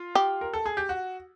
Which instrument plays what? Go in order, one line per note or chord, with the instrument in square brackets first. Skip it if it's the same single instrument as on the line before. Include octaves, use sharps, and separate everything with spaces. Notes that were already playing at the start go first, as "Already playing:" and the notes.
Already playing: [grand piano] F4
[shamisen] G4
[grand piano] A#4
A4
G#4
G4
F#4